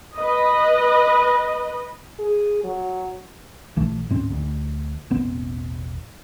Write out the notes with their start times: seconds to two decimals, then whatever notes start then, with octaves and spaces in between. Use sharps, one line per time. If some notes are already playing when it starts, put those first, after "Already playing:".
0.17 B4 D#5
2.19 G#4
2.64 F#3
3.76 A#1 E3 A3
4.09 D2 G#2 C4 C#4
4.30 D2
5.10 E1 A1 B3 C4